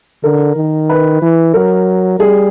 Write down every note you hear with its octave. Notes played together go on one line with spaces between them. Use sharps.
D3 A#4
D#3
B4
E3
F#3 A#4
G3 G#4